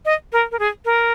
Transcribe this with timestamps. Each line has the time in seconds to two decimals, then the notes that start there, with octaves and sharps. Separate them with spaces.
0.05 D#5
0.33 A#4
0.51 A#4
0.59 G#4
0.85 A#4